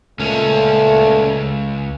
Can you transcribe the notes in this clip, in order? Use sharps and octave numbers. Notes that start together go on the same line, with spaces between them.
C#2 A#2 A3 C#4